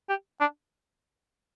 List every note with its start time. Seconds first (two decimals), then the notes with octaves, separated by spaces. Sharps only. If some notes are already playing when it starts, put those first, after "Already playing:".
0.09 G4
0.40 D4